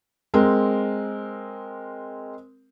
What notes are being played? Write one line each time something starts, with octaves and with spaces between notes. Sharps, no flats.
G#3 C4 A#4